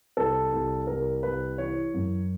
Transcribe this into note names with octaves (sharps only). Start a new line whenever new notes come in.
C2 A4
C2
C2 A#4
C2 B4
E3 C#5
F#2